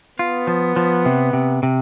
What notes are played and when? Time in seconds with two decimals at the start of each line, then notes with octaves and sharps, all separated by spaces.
0.19 B3 F4
0.47 F3
0.76 F3
1.06 C3
1.33 C3
1.63 C3